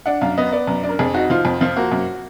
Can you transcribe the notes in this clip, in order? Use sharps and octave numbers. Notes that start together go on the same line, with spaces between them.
D4 F#5
F#2 F5
B3 D#5
B3 D5
F#2
D4
A#4
F2 G#4
D#4 F#4
F3 F4
F2
F3 F4
A#3 F#4
F#2